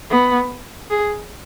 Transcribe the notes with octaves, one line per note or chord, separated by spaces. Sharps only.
B3
G#4